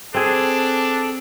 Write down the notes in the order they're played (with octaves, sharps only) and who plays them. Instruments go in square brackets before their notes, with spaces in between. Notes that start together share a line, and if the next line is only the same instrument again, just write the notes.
[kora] C4 G#4 [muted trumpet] D4 [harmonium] A4